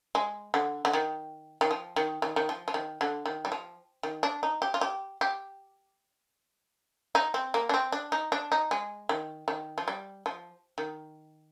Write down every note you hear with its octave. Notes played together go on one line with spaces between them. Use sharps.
G#3
D3
D3
D#3
D#3
F3
D#3
D#3
D#3
F3
F3
D#3
D3
D#3
G3
F3
D#3
D4
D#4
G4
F4
G4
G4
D#4
C4
A#3
D4
C4
D4
D#4
D4
D#4
G#3
D#3
D#3
F3
G3
F3
D#3